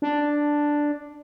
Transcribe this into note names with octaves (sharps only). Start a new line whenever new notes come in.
D4